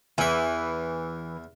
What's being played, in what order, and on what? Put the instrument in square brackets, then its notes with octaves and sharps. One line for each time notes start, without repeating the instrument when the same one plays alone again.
[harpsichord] E2 E5 [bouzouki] E3